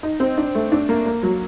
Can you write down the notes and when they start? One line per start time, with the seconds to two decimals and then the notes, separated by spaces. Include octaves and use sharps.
0.03 D#4
0.20 C4
0.38 D4
0.55 A3
0.72 D4
0.89 A#3
1.06 A#3
1.23 F#3